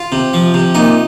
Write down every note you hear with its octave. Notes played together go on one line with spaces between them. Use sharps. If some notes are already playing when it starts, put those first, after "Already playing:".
Already playing: F4
C3
F3
C3
A#2 D#4